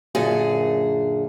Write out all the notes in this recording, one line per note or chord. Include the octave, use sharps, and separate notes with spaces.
F#2 A#2 D3 G#4